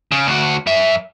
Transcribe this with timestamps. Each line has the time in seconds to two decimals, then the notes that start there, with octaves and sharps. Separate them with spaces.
0.12 C#3
0.27 D2 F#4
0.67 F#2 E5